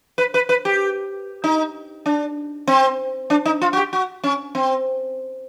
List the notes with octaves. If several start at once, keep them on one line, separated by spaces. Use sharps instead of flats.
B4
B4
B4
G4
D#4
D4
C4
D4
D#4
F4
F#4
G4
F#4
C#4
C4